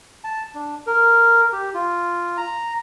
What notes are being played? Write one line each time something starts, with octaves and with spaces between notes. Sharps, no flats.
A5
D4
A#4
G4
F4
A#5